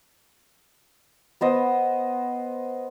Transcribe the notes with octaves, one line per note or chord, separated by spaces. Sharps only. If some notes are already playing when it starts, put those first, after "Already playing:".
B3 C5 D#5